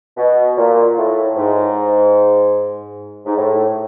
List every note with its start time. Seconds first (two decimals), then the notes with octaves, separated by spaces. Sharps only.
0.17 B2
0.57 A#2
0.97 A2
1.37 G#2
3.26 G#2
3.37 A2